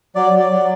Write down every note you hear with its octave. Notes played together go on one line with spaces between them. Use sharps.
F#3 D5
F#3
D5
F#3